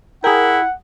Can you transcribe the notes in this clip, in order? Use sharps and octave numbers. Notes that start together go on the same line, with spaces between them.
E4 G#4 A#4 F#5 G5